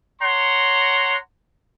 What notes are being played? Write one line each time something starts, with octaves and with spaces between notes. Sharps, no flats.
C#5 F#5 A#5 C6